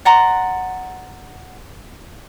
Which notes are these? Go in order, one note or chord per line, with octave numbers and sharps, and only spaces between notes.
D5 F#5 A#5 C6